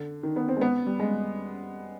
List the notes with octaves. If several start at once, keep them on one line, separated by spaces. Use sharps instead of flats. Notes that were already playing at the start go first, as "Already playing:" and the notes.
Already playing: D3
D#3
B3
C4
G#3
B3
G3
G#3